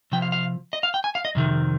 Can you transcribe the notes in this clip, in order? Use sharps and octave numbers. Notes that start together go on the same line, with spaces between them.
C3 F3 G5
F5
F5
D#5
F5
G5
G#5
F5
D#5
F2 C3 D#3